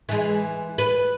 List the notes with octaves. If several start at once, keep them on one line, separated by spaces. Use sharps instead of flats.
E3 G#3
B4